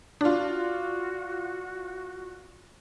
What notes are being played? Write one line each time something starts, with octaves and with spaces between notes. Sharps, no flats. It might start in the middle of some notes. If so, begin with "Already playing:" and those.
D4 F4 F#4 D5